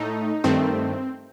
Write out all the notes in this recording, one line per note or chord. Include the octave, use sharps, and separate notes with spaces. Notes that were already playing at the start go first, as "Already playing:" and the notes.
Already playing: A2 A3 D#4
G2 D#3 A3 C4